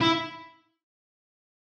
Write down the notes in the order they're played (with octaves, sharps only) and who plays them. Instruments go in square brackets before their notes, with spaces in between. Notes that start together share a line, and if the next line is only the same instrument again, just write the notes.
[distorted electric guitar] E4